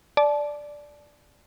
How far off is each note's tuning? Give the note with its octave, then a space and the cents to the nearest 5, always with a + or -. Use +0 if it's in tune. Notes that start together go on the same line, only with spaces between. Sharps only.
D5 +0 A5 -25